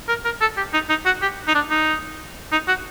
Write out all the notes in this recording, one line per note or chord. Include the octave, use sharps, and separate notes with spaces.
A#4
A#4
A4
G4
D#4
D#4
F#4
G4
D#4
D4
D#4
D#4
F#4